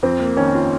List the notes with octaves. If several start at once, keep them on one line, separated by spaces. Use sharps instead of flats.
F2 C4
A#3
D#3 C#4
F4